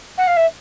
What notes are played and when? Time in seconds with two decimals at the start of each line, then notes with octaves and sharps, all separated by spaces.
0.18 F#5
0.27 F5
0.37 E5